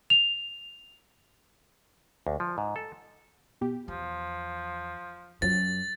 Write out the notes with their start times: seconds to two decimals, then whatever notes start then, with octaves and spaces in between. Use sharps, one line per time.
0.10 F7
2.27 D2
2.40 F3
2.58 G#2
2.76 A4
3.61 B2 G4
3.88 E2 F3
5.42 F#2 F3 F#3 A6